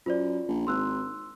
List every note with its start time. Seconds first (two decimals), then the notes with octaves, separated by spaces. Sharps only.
0.06 F#2 F4 C5 D5
0.48 A#1
0.67 G#1 C6 E6 F#6